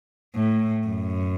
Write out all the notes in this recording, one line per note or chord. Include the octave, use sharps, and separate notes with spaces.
A2
F#2